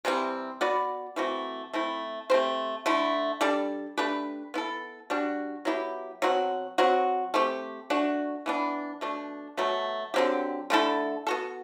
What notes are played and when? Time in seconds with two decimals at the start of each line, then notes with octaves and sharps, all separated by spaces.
0.05 C3 E3 G3 C4
0.61 B3 F#4 B4 D5
1.16 E3 A3 C4 F#4
1.74 A3 C4 E4
2.30 A3 C4 G4 C5
2.86 D3 A3 E4
3.41 G3 D4 A4 D5
3.98 A3 D4 G4 B4
4.54 B3 E4 A4
5.10 G3 D4 F#4
5.65 F#3 B3 E4 G4
6.22 B2 F#3 C4 F#4
6.78 F#3 C4 F#4
7.34 A3 C4 G4
7.90 A3 D4 F#4
8.46 E3 B3 D4
9.01 B2 A3 D4
9.57 B2 F#3 A3
10.14 D3 F#3 C4 G4
10.70 D3 A3 E4 A4
11.27 B3 F#4 A4